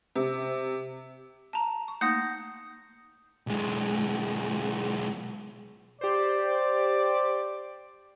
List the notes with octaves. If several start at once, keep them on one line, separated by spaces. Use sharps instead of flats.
C3
A5 A#5
C#6
A3 A#3 D#4 D#6 G6 A#6 C#7
B1 G#3
G4 C5 D5